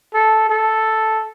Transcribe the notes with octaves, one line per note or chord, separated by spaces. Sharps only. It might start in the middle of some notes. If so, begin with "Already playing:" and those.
A4
A4